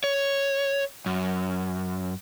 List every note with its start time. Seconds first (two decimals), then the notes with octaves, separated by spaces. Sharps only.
0.04 C#5
1.06 F#2